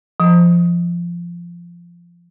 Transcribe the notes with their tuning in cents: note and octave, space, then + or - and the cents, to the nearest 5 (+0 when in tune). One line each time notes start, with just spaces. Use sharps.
F3 -15